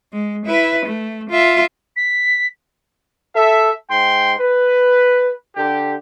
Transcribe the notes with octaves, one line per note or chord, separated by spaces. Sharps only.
G#3
E4 B4
A3
F4 E5
B6
A4 E5
G#2 G5 C6
B4
D3 G4